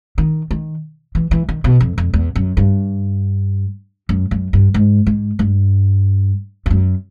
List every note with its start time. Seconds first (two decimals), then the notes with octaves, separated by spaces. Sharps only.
0.18 D#3
0.51 D#3
1.15 E3
1.31 E3
1.49 D#3
1.64 B2
1.81 F2
1.98 F2
2.14 E2
2.36 F#2
2.57 G2
4.09 F#2
4.31 F#2
4.53 G2
4.74 G#2
5.07 G#2
5.39 G2
6.66 F2
6.70 F#2